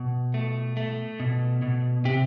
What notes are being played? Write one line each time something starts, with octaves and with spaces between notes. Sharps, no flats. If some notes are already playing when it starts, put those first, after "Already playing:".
Already playing: B2
A3
A3
B2
B2
C3 G4